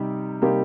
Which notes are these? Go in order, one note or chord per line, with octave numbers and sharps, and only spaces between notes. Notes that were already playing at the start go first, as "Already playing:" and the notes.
Already playing: C3 G3 D#4 G4
C3 G3 A#3 D#4 G4